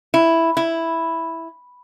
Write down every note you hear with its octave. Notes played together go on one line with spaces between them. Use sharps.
E4
E4